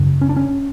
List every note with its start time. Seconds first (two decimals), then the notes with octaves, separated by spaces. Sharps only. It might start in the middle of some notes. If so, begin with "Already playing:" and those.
Already playing: F#2 C#3
0.21 C#4
0.29 D4
0.36 C#4